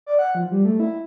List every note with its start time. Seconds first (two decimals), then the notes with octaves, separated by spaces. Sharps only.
0.06 D5
0.19 F#5
0.35 F3
0.51 G3
0.65 A3
0.80 E4